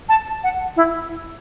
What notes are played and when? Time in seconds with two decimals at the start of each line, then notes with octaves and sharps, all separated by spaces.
0.09 A5
0.44 F#5
0.76 E4